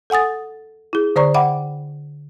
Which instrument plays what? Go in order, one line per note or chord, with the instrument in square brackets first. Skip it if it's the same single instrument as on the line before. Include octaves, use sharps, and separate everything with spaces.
[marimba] A4 F#5 G#5 D#6 A6
E4 G#4
D3 C5 D5 A#5 C#6
E5 F#5 G5 B5 D6